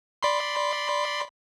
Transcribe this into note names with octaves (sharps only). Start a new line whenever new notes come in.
D5 B5 C6